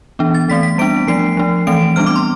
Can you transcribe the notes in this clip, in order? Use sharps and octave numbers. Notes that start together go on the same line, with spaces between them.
E3 B3 D4
A6
E3 A3 C4 B6
B6
G3 B3 D4 D7
F3 A3 D4 C7
F3 A3 D4
E3 A3 C4 D7
G3 B3 D4 F6
D6
C6